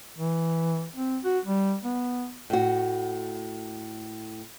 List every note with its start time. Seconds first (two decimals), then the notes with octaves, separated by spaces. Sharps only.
0.18 E3
0.96 C4
1.24 F#4
1.45 G3
1.84 B3
2.50 A2 F#4